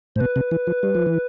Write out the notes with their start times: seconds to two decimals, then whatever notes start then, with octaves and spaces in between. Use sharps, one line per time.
0.15 A2 C5
0.20 B2 B4
0.36 C3
0.51 E3
0.67 F3
0.83 G3
0.95 F3
1.06 E3